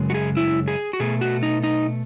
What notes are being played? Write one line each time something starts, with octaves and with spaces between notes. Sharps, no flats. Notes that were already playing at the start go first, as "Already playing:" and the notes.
Already playing: F#2 C#3 G#3
F#4
G#4
E4
G#4
F#4
B2 A3 G#4
F#4
D#4
D#4